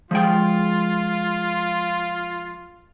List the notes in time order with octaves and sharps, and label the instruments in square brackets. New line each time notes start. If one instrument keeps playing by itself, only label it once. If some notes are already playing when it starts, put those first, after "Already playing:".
[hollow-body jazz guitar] F3 G#3 G5 [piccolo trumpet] F4